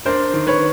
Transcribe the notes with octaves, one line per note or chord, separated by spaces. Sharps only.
D4 A#4 C5
D#3
B4 C#5